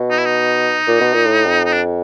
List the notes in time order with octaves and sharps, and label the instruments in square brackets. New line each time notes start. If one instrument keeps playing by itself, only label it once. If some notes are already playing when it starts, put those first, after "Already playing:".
Already playing: [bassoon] B2
[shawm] D#4
E4
D#4
[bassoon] A#2
B2
A#2
A2
F2
[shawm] D#4
D4